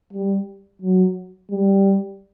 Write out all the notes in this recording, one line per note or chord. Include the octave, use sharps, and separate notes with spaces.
G3
F#3
G3